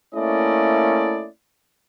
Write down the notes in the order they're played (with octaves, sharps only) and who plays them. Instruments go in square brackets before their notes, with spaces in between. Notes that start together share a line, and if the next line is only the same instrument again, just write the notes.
[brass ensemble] A3 A#3 C#4 E4 D5 D#5